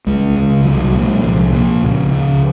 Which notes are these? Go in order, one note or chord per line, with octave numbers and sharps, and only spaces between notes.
C#2 G#3
C#3
C2 F#3
F#3
A#2
G#3
C2 F3
A#2
C#2
C#3